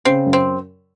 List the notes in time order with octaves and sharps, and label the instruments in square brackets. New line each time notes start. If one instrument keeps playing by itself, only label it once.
[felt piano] C#3 [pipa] C4
[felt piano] F#2
[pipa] C4